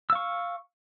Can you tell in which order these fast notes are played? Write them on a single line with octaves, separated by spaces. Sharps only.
E6 F5 C#6